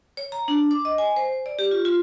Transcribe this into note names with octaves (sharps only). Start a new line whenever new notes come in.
C#5
A#5
D4
D6
D#5
G#5
C5
D5
G4
F4
F4